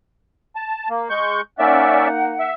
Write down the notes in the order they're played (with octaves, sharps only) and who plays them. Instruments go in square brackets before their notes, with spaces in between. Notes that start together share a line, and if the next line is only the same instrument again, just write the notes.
[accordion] A5
A#3
G#3 C#6 G6
[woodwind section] A#3 D#4 F#5 [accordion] C#4 D5 E5
[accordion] E5